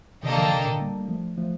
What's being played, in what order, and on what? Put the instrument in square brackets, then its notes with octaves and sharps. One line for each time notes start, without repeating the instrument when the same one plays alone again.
[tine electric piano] C3 D#3 [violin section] A#3 D4 A4 D#5 G5
[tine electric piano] D3 F3
C3 D#3
A#2 D3
G3 A#3
A#3
F3 A3
F3 A3